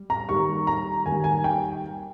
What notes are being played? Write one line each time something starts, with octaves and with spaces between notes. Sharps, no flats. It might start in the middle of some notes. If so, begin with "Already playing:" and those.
Already playing: G3
A#5
D#2 D#3 G3 C#6
A#5
D#2 D#3 G3 G#5
G#5
G5